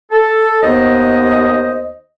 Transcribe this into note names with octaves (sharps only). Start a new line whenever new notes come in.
A4
D#2 B3 C5 D#5